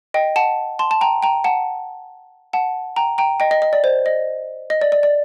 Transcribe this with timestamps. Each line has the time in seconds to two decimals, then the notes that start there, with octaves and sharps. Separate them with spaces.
0.14 D#5 G5
0.36 F#5 A5
0.79 A5 C6
0.91 A5
1.01 G5 A#5
1.23 G5 A#5
1.44 F#5 A5
2.53 F#5 A5
2.96 G5 A#5
3.18 G5 A#5
3.40 D#5 G5
3.51 D#5
3.62 D#5
3.73 D5
3.84 C5
4.06 D#5
4.70 D#5
4.81 D5
4.92 D5
5.03 D5